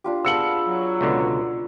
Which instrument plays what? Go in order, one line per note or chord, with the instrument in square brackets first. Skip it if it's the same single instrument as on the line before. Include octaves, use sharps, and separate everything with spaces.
[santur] D4 F4 G4
[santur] B3 G#4 B4 [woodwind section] F5 A5 [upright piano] E6 C#7 F#7
[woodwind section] F#3
[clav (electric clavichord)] C#2 B2 D3